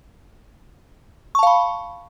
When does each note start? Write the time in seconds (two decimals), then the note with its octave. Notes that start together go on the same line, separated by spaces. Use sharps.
1.35 C#6
1.39 A5
1.43 F5
1.47 B5